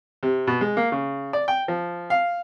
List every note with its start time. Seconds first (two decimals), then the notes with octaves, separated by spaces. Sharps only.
0.23 C3
0.47 B2
0.61 G#3
0.77 A#3
0.92 C#3
1.33 D5
1.48 G5
1.68 F3
2.10 F5